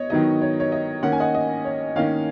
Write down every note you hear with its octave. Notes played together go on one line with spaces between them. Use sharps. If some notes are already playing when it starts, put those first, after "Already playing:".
Already playing: B3 C#5 D#5
D#3 F#3 B3 D#4 D#5
C#5
C#5
D#5
D#3 A#3 C#4 F#5
G#5
D#5 F#5
D#5
C#5
D#3 A#3 C#4 C#5 F5